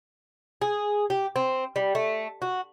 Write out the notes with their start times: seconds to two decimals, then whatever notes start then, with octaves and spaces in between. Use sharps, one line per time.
0.62 G#4
1.10 G4
1.36 C4
1.76 G3
1.95 A3
2.42 F#4